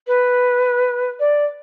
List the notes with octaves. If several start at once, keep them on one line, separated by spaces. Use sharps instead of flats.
B4
D5